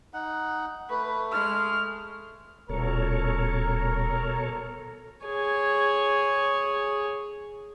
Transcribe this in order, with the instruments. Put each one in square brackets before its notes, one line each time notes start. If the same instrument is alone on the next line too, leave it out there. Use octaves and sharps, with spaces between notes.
[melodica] D#4 F#5
[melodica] A3 [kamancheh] B4
[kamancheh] G#3 F6
[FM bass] D#1 [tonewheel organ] B2 A4 C#5 [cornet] A#4
[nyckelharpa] G#4 C#5